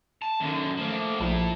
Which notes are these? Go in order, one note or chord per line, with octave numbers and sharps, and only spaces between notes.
A5
F#2 D3 D#3
F3 A3 A#3
A#1 E4 A5